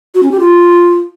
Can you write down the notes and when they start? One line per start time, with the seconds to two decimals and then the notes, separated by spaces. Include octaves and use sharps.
0.15 F#4
0.23 C#4
0.31 G4
0.40 F4